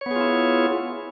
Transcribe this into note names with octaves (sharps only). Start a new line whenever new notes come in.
B3 E4 F4 G#4 C#5